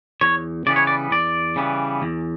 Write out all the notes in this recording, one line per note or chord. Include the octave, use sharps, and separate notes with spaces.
E2 C#5
C#3 E3 G3 B3 D5
C#5
D5
E2 D5
C#3 E3 G3 B3
E2